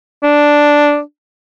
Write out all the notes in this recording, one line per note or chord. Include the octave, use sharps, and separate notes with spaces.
D4